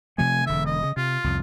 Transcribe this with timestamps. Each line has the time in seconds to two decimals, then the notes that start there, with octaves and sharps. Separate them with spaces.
0.18 C3 F3 A3 G#5
0.46 E1 D3 E5
0.66 D#5
0.83 C#3
0.97 C3 F4
1.24 C2 F2